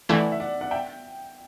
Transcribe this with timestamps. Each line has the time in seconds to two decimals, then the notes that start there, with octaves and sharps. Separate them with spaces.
0.09 E3 A3 E4 D5 F#5
0.32 E5
0.40 D5 F#5
0.61 D5 F#5
0.71 E5 G5